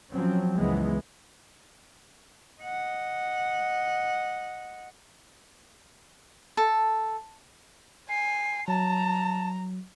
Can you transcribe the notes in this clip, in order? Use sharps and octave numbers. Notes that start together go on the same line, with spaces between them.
F3 F#3 C4 C#4
C#2 F#2 E3 G#3 B3
D#5 F#5
A4
G#5 C7
F#3 A5 A#5